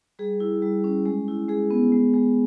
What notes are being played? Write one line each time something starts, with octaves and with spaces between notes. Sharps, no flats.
G3 G#4
E4
G3
C#4
G#3
E4
G#3 G#4
B3
G#3
G#3